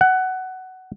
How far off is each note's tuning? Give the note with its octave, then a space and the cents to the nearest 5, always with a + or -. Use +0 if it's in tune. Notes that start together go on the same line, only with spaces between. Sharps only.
F#5 +15